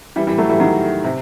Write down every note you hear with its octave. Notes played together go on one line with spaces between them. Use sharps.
E3 G3
E3 G3
F#3 A3
E3 G3
D#3 F#3
C3